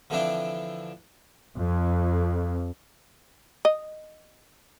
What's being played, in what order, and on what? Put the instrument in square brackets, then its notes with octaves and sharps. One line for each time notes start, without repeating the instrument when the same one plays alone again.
[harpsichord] D3 E3 F3 C4 D4 E4
[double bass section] F2
[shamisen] D#5